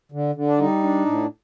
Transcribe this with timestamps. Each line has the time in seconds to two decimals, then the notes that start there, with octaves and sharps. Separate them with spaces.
0.12 D3
0.35 D3
0.47 D4
0.59 G3 D#4
0.83 D4
1.06 A2